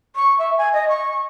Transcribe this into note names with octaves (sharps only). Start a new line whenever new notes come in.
C#6
E5
G#5
D#5
C#6